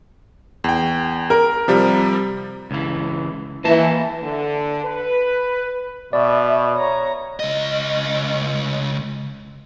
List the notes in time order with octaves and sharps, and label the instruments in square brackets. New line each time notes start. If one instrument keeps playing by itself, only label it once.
[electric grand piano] E2 G5
[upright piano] A#4
[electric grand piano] C3 F3 G3
[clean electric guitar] C#2 E3
[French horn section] E3 [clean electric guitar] A#3 D#5 A5
[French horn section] D3
B4
[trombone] B2 [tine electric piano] D5 [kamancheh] E5
[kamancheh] C#5 A#5
[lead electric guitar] C#2 D#5